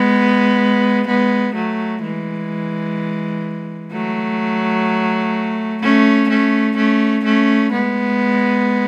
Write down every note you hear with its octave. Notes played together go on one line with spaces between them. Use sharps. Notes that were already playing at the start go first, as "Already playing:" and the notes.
Already playing: G#3 B3
G#3 B3
F#3 A3
E3 G#3
F#3 A3
A3 C#4
A3 C#4
A3 C#4
A3 C#4
G#3 B3